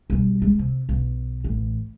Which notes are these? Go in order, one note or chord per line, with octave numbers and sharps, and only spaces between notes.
B1 G3
G#3
C3
B1
A1